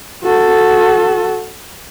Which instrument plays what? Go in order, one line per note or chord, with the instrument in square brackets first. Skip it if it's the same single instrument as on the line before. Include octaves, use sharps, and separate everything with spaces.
[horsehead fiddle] F#4 A4